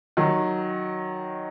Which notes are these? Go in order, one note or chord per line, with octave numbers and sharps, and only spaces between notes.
D#3 F#3